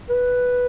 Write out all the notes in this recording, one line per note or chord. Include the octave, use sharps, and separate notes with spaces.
B4